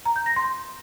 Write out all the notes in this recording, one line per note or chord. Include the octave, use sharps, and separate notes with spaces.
A#5
G6
A#6
C6